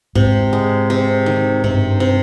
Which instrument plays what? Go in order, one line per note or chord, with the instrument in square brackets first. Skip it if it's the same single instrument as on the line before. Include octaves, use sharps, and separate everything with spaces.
[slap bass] G#2 [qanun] C3
[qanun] G#3
C3
D#3
[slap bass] G2 [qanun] C3
[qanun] C3